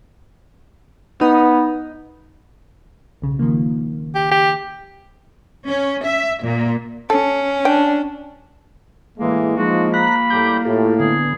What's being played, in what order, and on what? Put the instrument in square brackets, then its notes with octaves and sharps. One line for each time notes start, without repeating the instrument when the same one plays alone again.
[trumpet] B3 [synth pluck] D#4
[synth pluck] B1 C#3
D#3 F3 A#3
[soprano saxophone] G4
G4
[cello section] C#4
E5
A#2
[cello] C#4 [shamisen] A4
[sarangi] D4 [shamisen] G5
[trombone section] A2 E3 G#3 [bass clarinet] A#3
[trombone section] F3 G#3 [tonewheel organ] D#4 [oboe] F#4
[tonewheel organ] A#5 F#6 [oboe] B5
[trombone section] A2 G3 [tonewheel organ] A#5 D6 G6
[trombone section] A2 [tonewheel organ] F4 G4 A4
[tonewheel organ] D3 B3 [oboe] G#4